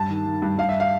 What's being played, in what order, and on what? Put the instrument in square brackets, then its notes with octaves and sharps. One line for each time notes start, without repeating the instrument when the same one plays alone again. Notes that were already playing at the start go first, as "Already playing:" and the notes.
Already playing: [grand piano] G2 A5
D#3
D#3
G2
G2 F5
E5
F5